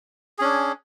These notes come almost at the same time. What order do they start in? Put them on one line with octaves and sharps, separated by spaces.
G#4 C#4 D4